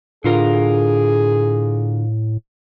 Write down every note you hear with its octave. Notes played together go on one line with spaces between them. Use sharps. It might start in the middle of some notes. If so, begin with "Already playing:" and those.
A2 D3 F4 G#4 A#4